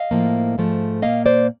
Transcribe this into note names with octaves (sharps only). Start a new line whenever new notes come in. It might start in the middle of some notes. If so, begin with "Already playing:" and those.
Already playing: D#5 F5
A2 F3 A#3
G#2 F3 A3
A#2 F#3 A#3 D#5 F5
C5 D5